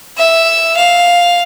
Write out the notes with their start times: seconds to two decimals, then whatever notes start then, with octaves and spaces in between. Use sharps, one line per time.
0.17 E5
0.76 F5